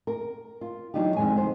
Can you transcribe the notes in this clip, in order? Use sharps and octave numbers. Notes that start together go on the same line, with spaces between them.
A#4
F4
E3 F#3 D4 D#4 F4 G4
F2 D#3 G#3 G4 G#5
D#3 B3 C5